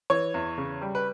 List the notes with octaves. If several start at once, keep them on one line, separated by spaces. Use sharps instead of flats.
E3 C#5
E2
C#3
G3
B4